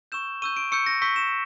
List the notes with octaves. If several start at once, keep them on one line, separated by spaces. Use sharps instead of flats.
C#6 E6 G6 E7
C#6 E6 G6 D#7
D7
C#6 E6 G6 C#7
A#6
C#6 E6 G6 B6
E7